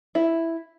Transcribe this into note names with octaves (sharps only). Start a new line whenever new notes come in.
E4